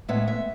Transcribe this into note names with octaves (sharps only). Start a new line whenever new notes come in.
A2 G#3 B3 E5
E5